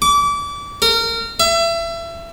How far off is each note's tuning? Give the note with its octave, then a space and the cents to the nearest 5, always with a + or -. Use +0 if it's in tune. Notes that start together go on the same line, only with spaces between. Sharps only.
D6 -30
A#4 -25
E5 +30